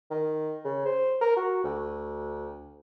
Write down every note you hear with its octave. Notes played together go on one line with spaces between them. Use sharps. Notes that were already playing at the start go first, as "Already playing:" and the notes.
D#3
C#3
C5
A#4
F#4
D2